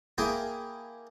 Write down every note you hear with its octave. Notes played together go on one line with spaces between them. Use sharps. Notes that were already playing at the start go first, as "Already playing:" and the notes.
A#3 E4 G#4 G5